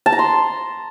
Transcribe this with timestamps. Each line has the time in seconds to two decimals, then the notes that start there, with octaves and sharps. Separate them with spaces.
0.06 A5
0.12 A#5
0.19 C6